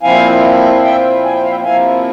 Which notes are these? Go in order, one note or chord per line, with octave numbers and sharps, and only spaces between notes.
A#2 F3 C4 E4 F5 G#5
E5 G5
G#5
G5
F5
E5 G5
C3 F3 A#3 E4 F5 G#5